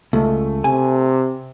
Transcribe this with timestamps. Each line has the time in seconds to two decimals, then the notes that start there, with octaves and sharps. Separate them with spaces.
0.13 C#2 A3
0.64 C3 G#5